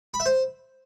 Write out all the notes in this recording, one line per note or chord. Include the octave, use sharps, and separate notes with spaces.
B5
E5
C5